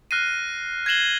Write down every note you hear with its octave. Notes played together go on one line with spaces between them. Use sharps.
F6 F#6 A#6 C7 D#7
G#6 A#6 C7 E7 F#7 G7